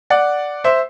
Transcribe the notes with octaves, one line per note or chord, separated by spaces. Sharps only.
D5 F#5
C5 E5